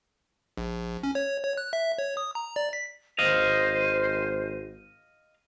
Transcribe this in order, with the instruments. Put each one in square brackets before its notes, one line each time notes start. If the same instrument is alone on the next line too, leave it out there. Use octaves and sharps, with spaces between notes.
[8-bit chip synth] A#1
C#4
C#5
C#5
F#6
E5
C#5
D#6
A#5
D5
B6
[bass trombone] G#1 [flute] C5 [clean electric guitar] D#5 F5